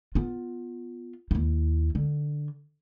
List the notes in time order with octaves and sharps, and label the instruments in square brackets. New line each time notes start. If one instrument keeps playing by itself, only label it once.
[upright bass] B3 F4
D#2 E4
D3